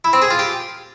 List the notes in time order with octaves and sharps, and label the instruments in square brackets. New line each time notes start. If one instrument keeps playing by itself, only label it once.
[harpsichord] E4
C4
G#4
F4
G4